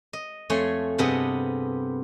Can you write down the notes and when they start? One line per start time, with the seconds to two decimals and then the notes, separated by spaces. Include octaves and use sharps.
0.13 D#5
0.50 F2 A3 C#5 G#5 C6
0.98 G2 C3 B3 G#4 A4 D#5